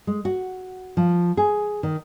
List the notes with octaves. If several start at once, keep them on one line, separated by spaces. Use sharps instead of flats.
G#3
F#4
F3
G#4
D#3